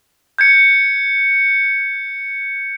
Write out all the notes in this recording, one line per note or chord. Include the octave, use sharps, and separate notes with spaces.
G6 G#6 C#7